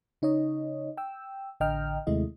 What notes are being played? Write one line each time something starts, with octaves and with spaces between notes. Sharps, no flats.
C#3 D#4 C#5 D#5
G5 E6
A1 D3 D#5 G5 A#5 F6
D#2 C3 G#3 A3 E4 D#5